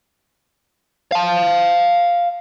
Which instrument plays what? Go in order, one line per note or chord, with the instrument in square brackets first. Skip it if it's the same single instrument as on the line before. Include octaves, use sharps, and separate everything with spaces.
[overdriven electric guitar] F5 A5